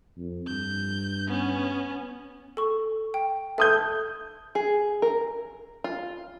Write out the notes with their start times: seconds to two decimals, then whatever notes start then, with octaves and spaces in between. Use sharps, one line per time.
0.17 F2
0.48 G2 G6
1.28 B3 C#4
2.57 A4 C#6
3.14 G5
3.58 A4 E5 D#6 G6
4.55 G#4
5.02 A#4
5.84 F4